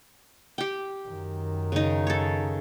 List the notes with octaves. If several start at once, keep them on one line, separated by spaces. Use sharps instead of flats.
G4 G5
F#2 D#3
C#3 D#4
A4 C#5